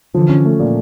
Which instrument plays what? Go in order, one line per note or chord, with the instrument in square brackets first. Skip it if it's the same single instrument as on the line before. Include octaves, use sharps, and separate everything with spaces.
[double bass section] D3 E3 [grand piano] F3
[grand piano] C#4
A3
A#2